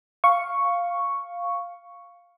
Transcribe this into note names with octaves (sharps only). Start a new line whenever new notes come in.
F5 C#6